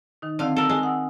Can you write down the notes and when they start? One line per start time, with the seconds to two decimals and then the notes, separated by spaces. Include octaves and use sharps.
0.22 D#3 D#4
0.39 D3 D#3 C4 F5
0.56 A4 A#4
0.70 G#3
0.83 F#5 D#6 E6